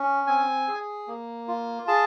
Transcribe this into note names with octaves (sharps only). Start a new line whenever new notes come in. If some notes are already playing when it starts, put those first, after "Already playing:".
Already playing: C#4
C4 G#5
G#4
A#3
F4
G#4 A5